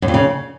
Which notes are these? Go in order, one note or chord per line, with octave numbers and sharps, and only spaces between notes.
F#2
F2
C#3